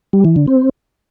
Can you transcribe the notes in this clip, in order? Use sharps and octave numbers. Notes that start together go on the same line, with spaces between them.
G3
E3
D3
C4